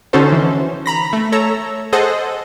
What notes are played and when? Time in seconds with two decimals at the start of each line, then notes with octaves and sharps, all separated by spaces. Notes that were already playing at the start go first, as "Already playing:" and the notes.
0.13 D3 C#4 D#4 F#4 A4 C5
0.32 E3
0.86 A#5 B5 A#6
1.13 A3
1.32 A4 C#5 A#5 E6
1.93 G#4 A4 C5 D#5 F#5